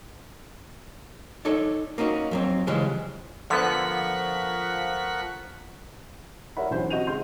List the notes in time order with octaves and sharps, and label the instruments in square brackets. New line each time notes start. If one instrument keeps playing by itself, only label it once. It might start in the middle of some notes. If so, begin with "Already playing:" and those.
[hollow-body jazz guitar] D#4 A4 C#5 D5
A#3 C#4 D#4 F#4
F2 F#3 C4
C#3 E3 F3 G3 G#3
[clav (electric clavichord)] D3 B3 [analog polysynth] F3 F#6 B6 [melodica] A#4 F#5 C#6
[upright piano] A#4 C#5 D5 E5 F#5 B5
B1 E3 C#4 C5 F#5 G6
C4 F#4 D#5 G6 D#7 F7
C#3 G#3 D#5 C6 G6